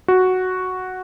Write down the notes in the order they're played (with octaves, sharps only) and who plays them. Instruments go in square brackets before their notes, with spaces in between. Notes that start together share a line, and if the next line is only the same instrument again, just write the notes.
[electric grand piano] F#4